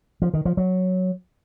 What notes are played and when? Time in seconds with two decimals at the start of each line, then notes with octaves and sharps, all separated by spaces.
0.22 F3
0.34 D#3
0.45 F3
0.57 F#3